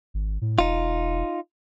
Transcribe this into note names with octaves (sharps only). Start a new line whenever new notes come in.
G#1
A2
E1 D#4 F4